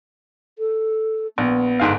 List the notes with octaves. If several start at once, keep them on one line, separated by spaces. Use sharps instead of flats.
A4
A#1 B3
G1 G#2 F5